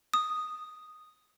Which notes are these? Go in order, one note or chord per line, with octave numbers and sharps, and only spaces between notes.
D#6